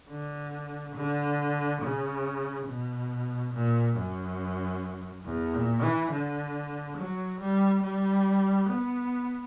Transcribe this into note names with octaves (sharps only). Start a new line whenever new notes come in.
D3
D3
C#3
B2
A#2
F#2
E2
A#2
E3
D3
F#3
G3
G3
B3